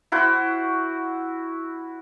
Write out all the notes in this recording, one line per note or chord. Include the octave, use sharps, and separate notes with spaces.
E4 F#4 C5